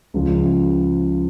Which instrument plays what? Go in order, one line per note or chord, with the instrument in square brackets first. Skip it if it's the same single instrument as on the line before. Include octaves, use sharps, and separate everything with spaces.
[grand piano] C#2 C#3 F3